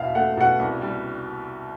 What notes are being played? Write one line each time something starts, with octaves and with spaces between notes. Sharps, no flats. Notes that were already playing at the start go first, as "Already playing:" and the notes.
Already playing: E2 B2 E5 F5
A3 F#5
B2 F#5
C2
G3